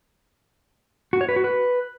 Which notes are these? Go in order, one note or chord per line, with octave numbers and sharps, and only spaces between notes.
F#4
C#5
B4
F#4
B4